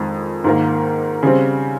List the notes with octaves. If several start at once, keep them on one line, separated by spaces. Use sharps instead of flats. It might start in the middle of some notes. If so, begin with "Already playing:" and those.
Already playing: F2 D#3 G#3
G#2 D#3 A#3
C#3 G3 C4